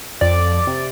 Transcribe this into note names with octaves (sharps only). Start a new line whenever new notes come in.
F2 D5
C3